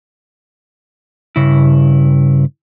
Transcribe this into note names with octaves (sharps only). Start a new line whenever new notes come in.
G2 C#3 E4